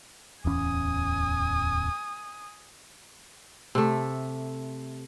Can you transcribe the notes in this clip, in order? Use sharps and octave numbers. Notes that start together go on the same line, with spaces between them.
D1 E2 C#4 G#5 D#6
C3 A3